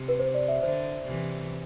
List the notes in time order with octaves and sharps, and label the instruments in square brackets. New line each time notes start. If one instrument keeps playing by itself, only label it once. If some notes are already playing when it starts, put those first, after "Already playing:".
Already playing: [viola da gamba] C3
[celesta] B4
C5
D5
E5
[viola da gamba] D3 [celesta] C5
[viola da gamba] C3 E3